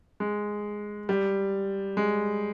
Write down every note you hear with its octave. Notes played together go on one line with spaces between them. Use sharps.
G#3
G3
G#3